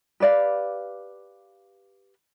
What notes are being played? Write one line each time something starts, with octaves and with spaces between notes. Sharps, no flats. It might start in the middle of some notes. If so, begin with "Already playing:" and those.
G4 B4 D5 F5